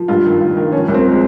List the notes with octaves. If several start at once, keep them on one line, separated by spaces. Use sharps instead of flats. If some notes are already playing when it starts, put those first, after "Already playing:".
Already playing: F3
G2 F4
D#3
G2
D#3
F3 C#4
C2
C4
F3
G#3